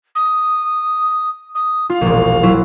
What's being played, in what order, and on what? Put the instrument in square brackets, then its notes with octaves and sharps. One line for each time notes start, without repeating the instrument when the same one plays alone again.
[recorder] D#6
D#6
[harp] F4 [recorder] F5
[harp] E1 A#1
F#3 E4 F4